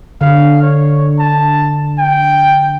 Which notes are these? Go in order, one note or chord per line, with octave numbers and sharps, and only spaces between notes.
D3 F5
C#5
A5
G5